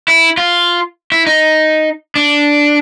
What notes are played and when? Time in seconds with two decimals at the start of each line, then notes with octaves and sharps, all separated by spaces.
0.08 E4
0.37 F4
1.12 E4
1.27 D#4
2.16 D4